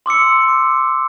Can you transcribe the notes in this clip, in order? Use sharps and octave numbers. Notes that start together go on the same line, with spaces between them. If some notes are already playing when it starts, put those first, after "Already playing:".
C6 D6 E6 C#7